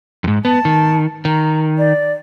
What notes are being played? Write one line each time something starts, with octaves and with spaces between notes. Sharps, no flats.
F2 G#2
B3 A5
D#3
D#3 A#5
D5